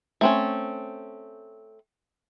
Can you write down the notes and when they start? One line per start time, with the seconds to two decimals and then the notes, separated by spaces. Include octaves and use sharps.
0.21 A3 C4 C#4